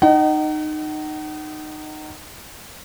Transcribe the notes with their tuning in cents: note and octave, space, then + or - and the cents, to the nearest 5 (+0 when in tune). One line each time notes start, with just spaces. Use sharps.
D#4 -20 D#5 -5 F#5 +40